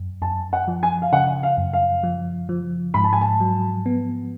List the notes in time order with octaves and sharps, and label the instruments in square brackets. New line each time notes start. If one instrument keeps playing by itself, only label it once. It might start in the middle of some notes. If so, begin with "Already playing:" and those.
Already playing: [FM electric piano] F#2
[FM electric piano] F#2 [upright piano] A5
[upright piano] F#5
[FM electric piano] F3
[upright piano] G#5
F5
[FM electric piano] C#3 [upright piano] F#5
[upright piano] F5
[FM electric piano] F#2
[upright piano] F5
[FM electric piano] F3
F3
[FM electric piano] G#2 [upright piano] B5
[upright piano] A5
G#5
A5
[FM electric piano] F#3
B3